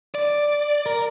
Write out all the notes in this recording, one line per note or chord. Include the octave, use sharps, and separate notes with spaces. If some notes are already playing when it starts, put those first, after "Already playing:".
D5
A#4